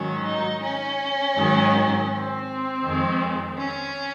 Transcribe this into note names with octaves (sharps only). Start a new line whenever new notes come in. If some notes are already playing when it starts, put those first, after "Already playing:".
Already playing: G#2 D#3 F#3 C#4
D#4
C#4
G#2 D#3 F#3
C4
F2 D#3 G#3
C#4